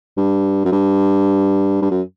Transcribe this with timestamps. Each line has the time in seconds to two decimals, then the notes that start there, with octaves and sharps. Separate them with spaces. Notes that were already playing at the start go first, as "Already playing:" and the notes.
0.17 G2
0.65 F#2
0.72 G2
1.82 G2
1.91 F#2